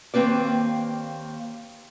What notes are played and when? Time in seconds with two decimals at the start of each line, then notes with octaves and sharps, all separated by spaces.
0.14 D#2 A#3 C4 B4 D5